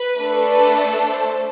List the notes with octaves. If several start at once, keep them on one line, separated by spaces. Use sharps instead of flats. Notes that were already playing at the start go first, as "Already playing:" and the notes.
Already playing: B4
A3 D4 A4
B4
B4
C5